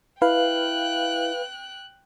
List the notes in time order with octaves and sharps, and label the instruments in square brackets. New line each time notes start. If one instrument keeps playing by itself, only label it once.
[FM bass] E4 [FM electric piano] B4 F5 [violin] G5 F#6